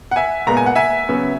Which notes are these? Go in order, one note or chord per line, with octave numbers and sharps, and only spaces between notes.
F#5
E5 G#5
A#2 G#3 B3 A#5
G#5
F#5
E5 G#5
C#3 F#3 B3